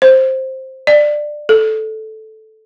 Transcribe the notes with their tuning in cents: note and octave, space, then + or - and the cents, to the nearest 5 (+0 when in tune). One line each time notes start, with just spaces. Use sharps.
C5 +10
D5 +15
A4 -10